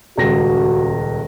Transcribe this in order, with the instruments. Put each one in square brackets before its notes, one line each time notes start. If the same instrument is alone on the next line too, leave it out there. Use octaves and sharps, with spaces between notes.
[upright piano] D#1 C#2 A#6 [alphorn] F#4